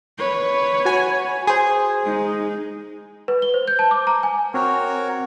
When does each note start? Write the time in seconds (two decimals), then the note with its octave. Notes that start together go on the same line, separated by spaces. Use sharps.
0.18 B4 C#5
0.85 F#4 G#5
1.47 G#4 C5
2.04 G#3 D#4
3.28 B4
3.42 G7
3.54 C5
3.68 G6
3.79 A5
3.91 D6
4.07 A#5
4.23 G#5
4.54 C4 F#4 A#4 C#5